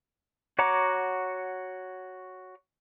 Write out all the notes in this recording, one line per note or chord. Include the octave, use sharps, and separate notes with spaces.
F#4 C#5 F#5 A#5 D6